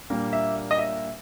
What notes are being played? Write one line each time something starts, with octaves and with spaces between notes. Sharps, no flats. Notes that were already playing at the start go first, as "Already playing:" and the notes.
A#2 G3 A#3 D4
E5
D#5
E5